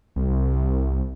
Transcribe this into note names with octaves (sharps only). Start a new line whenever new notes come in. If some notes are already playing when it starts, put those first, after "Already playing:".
C2